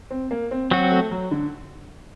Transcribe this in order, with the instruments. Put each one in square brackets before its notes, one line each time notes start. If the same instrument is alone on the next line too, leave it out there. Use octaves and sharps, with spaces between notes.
[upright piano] C4
A#3
C4
[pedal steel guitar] F#3 C4 F#4
[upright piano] A3
F#3
D3